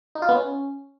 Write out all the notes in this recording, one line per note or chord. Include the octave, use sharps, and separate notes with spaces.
D#4
F4
B3
C#4